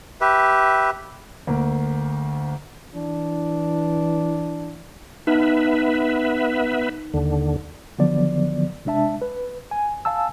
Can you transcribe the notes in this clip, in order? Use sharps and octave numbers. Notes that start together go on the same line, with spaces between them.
G4 B4 E5
D2 A#3
E3 D4
B3 D#4 B4 E5
D#2 D3
D3 D#3 F3 F#3 B3 D5
C3 G#3 D4 E5 A5
B4
G#5
F5 G#5 A5 E6